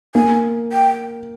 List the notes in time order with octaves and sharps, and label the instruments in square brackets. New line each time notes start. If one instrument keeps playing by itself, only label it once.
[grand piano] A#3 [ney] G#5
[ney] G5